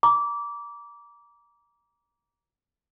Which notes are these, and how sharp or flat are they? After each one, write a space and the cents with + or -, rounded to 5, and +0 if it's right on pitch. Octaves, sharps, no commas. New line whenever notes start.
A#5 +25 D6 -20